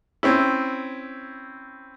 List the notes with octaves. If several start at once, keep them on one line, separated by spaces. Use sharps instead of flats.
C4 C#4 E4